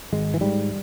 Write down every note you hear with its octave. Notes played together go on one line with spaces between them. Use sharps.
G#1 G#3
E3
G#2 G3